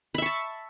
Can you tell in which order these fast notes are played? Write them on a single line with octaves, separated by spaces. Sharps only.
B5 E5 C#6 A5